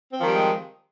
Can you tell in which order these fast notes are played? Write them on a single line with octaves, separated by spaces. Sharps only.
C4 F3 D#3 G3 G#3